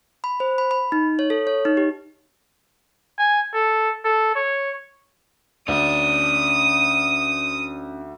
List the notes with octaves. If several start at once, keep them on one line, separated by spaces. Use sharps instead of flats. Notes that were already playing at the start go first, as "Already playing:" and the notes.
B5
C5
B5
B5
D#4
C#5
A4
C#5
D#4
G4
G#5
A4
A4
C#5
D2 C#4 D5 D#6